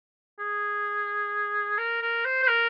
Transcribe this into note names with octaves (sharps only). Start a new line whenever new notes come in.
G#4
A#4
A#4
C5
C5
A#4